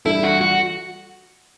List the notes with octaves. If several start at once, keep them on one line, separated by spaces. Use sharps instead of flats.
E3 G3 D4 E4 A4
F#4
F#4